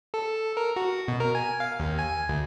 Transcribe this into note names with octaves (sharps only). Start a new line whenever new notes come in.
A4
A#4
F#4
B2
A#4
G#5
F5
D#2
G#5
D2